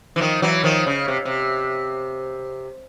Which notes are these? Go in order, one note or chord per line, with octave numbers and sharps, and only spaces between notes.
E3
D#3 F3
E3 F#3
D#3 F3
C#3
C3
C3